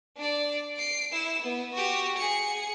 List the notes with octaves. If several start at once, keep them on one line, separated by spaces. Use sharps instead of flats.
D4 D5
C7 D7
E4 E7
B3
F#4 G4
G#4 C#7